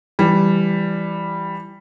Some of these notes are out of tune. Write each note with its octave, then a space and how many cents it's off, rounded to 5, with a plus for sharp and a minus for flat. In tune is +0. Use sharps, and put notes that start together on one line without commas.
E3 +25 G3 +5